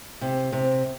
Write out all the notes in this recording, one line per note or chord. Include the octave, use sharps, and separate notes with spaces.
C3
C3